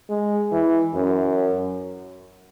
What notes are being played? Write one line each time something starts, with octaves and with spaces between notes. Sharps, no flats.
G#3
E3
F#2